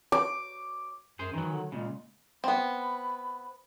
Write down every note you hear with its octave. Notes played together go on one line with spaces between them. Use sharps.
D6
F#2 G#4 C5
D#3 E3 F#3
D3
A#2 C#3 G#3
B3 C4 B5